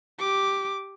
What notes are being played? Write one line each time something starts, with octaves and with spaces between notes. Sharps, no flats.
G4 D6